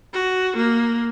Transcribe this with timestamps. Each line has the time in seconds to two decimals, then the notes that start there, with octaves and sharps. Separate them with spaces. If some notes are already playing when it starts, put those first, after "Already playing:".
0.13 F#4
0.56 A#3